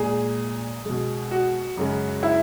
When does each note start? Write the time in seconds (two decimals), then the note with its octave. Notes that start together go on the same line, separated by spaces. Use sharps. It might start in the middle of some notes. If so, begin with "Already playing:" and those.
Already playing: A#2 G#3 G#4
0.85 B2 G#3
1.31 F#4
1.77 F#2 C#3 G#3
2.23 E4